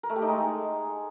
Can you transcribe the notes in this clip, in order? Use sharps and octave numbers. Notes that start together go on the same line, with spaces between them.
A#4
A3
G4
D#4
G#3